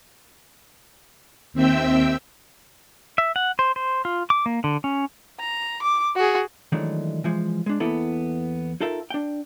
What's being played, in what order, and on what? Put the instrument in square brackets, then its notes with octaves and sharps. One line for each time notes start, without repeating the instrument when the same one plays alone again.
[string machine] D#2 C4 E5 G5 E6
[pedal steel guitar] E5
F#5
C5
C5
F4
D6
A#3
D3
C#4
[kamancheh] A#5
D6
F#4 G#4
[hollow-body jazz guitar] D#3 E3 F#3 G#3 A3 D4
E3 F3 G#3
G#3 D4
E2 A#3 B3 E4 A4 B5
D#4 F4 A4 A#4 E5
D4 G5